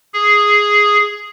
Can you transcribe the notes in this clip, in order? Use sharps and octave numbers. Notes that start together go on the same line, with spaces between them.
G#4